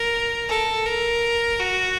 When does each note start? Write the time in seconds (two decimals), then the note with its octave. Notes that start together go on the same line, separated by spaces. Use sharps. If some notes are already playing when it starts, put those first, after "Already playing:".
Already playing: A#4
0.49 A4
0.86 A#4
1.59 F#4